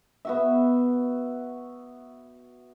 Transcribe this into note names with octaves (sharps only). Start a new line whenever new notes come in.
B3 F#4 E5